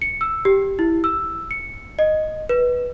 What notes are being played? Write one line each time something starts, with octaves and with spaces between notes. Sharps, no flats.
C#7
E6
G4
E4
E6
C#7
D#5
B4